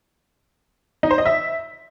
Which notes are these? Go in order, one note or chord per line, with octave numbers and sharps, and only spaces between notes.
D#4
C5
D#5
E5